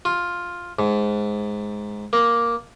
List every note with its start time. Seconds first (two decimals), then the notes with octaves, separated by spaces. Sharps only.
0.05 F4
0.79 G#2
2.13 A#3